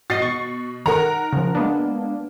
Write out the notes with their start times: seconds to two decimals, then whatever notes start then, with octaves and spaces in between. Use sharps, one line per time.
0.10 F#4 D#5 A6 C7
0.22 B2 C#6
0.86 D#3 A#4 F#5 A#5
1.33 C#3 F3
1.55 G#3 A#3 B3 D4